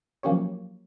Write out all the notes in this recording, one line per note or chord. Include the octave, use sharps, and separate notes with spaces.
F3 F#3 A#3 C#4 G4 C#5